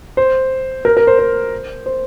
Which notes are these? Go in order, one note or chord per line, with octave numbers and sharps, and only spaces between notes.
C5
A#4
A#4
C5
C5
C5